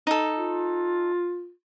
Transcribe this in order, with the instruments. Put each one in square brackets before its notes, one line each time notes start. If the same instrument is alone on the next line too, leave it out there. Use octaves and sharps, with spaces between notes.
[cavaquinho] D#4 A4
[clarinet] F4